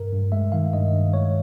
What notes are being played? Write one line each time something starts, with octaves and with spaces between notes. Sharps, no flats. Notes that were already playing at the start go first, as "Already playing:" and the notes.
Already playing: G2 A#4
G2
G#3 E5
D#3 F5
G2 D#5
G2
G#3 C#5